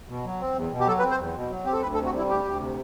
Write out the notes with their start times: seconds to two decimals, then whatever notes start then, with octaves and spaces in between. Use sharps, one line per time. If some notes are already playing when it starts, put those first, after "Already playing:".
0.09 B2
0.25 F#3
0.41 C4
0.56 E2
0.71 B2
0.80 G4
0.87 F#3 A4
0.99 B4
1.03 C4
1.11 C5
1.18 E2
1.35 B2
1.50 F#3
1.65 C4 G4
1.73 A4
1.82 D2 B4
1.94 A4
1.98 C3
2.06 F#4
2.14 G3 E4
2.29 D2 G4
2.45 D2
2.60 C3